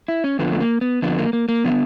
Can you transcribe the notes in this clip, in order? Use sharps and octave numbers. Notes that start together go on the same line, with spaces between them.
E4
C#4
F2 D3 F3 B3
A3
A#3
B3
F2 D3 F3 B3
A#3
A#3
A#3
D3 F3 B3